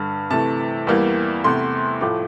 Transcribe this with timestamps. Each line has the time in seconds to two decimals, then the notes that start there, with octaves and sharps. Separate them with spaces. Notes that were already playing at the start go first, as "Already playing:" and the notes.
Already playing: G2 D3 G3
0.31 C3 E3 A3 A5
0.87 E2 E3 G3 A#3
1.44 E2 C3 E3 A3 C6
2.01 A2 F3 A3 D6